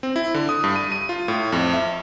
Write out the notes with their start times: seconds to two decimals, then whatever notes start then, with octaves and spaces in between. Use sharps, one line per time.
0.03 C4
0.16 E4
0.34 D3
0.49 D#6
0.64 G2
0.76 D#7
0.92 D#7
1.09 F4
1.28 A2
1.52 F2
1.73 E5